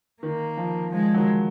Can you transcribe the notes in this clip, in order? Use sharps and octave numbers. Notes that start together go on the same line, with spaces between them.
D#3 A#3
F3
F3 G#3
D#3 F#3